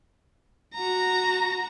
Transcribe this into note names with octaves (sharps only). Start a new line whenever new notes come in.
F#4 A#5